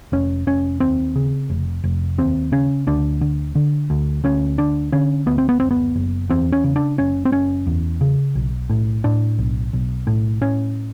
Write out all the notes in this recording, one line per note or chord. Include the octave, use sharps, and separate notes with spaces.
F1 C#4
F1 C#4
D#2 C4
C#3
F1
F1
D#2 C4
C#3 C#4
D2 D4
D3
D3
D2
D2 C#4
D3 D4
D3 C#4
D2 B3
C4
B3
F#1 C4
B3
F#1
E2 C4
C#4
C#3
D4
F#1 C#4
C4
F#1 C#4
E2
C#3
B1
A2
A2 D4
B1
B1
A2
A2 C#4